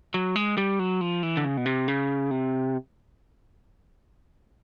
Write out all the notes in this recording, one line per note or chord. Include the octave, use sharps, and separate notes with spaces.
F#3
G#3
G3
F#3
F3
E3
D3
C#3
B2
C3
C#3
C3